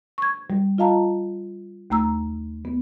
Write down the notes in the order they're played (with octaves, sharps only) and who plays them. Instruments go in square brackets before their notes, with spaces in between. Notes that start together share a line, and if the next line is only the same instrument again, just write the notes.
[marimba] C#6 G#6
G3
F4 D#5 F5 A5 A#5
D#2 A3 A#5 E6
B3